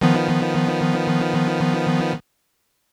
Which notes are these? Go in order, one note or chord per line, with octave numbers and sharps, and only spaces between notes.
D#3 F3 B3